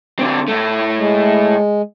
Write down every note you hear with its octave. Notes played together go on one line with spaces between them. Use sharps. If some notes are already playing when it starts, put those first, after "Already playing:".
D3 C4
A2 A3
G#3